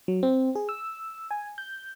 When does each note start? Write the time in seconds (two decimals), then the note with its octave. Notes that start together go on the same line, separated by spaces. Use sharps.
0.08 F#3
0.23 C4
0.55 G#4
0.69 E6
1.31 G#5
1.58 G6